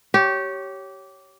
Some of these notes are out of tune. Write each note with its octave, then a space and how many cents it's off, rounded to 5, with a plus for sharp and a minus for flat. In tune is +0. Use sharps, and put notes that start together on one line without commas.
G4 -20 C#5 +0